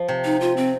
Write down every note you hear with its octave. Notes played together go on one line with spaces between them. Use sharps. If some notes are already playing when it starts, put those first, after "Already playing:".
Already playing: F3
C3
D#4
F4
C4